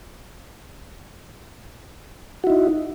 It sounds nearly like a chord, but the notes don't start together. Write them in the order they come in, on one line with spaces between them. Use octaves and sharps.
F#4 E4 D#4